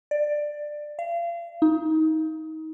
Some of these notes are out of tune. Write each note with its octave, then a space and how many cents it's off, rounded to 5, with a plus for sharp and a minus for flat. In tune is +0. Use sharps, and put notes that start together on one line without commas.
D5 +15
F5 -35
D#4 +25